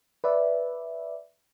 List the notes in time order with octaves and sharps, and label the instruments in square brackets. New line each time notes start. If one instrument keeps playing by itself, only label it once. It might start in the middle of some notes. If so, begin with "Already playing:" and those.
[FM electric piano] B4 D5 E5